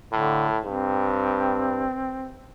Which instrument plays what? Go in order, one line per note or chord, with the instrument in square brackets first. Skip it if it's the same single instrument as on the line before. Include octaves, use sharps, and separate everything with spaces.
[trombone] A2 [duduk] D3
[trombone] G2 [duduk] C4